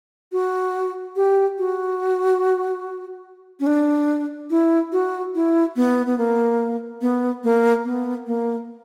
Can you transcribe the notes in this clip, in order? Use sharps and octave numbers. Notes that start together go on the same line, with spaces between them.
F#4
G4
F#4
C#4
D4
E4
F#4
E4
B3
B3
A#3
B3
A#3
B3
A#3